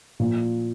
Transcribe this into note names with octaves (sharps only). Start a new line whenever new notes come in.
A#2 F3 A#3